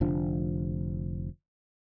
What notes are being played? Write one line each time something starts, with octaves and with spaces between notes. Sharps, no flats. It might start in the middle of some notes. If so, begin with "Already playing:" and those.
F1 D3 F3 D4